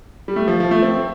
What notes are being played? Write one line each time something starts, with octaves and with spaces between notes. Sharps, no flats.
G3
A3
F3
F3
A3
C4